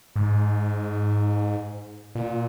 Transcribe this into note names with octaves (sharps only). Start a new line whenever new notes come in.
G#2
A#2